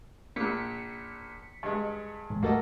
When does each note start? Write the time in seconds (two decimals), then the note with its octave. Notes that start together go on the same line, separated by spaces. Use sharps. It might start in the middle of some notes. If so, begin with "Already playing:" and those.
0.36 A#1 A#2 B6 C#7
1.63 G2 G#3
2.30 A1 D#2 G#2
2.43 G3 A3 A#3 F#4 A4 D#5